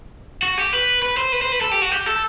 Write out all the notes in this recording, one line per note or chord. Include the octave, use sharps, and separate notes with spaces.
F#4
G4
B4
B4
C5
B4
C5
B4
A4
G4
F#4
G4
A4